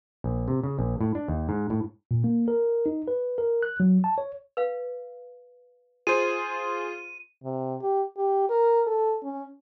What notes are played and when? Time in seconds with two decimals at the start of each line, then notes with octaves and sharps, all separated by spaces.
0.24 A#1
0.48 C3
0.63 C#3
0.79 A#1
1.01 A2
1.15 D4
1.28 D#2
1.49 G#2
1.70 A2
2.11 A#2
2.24 A#3
2.48 A#4
2.86 D#4
3.08 B4
3.38 A#4
3.63 F#6
3.80 F#3
4.04 A5
4.18 C#5
4.57 B4 F5
6.07 F4 G#4 C5 D#7
7.43 C3
7.82 G4
8.17 G4
8.50 A#4
8.87 A4
9.23 C#4